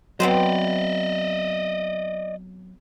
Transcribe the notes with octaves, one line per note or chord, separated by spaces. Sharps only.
F#3 B3 C4 C5 D5 D#5